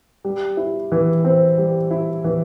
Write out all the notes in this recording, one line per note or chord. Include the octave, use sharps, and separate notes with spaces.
G3
E4
E3
C4
G3
E4
E3